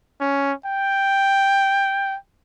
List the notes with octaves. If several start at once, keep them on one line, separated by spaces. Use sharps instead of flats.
C#4
G5